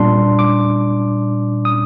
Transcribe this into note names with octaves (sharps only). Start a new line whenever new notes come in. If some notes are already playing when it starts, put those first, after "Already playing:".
Already playing: A#2 G3 D4 C6
D6
D#6